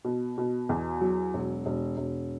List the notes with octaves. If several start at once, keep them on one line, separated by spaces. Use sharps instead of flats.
B2
B2
E2
F#3
E1
E1
E1